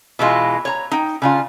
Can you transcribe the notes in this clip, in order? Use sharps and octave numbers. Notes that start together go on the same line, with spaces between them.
B2 E3 G#3 F4
C#5 A#5
D#4 G5
C#3 D4 F4